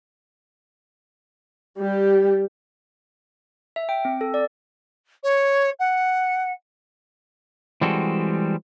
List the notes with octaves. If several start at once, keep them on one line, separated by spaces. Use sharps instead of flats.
G3 G4
E5
G5
C4
A4
D5
C#5
F#5
E3 G3 G#3 C4 F#4 A4